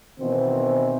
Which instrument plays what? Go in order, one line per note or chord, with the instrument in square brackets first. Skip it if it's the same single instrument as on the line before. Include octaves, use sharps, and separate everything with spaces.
[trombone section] B2 D#3 E3 C4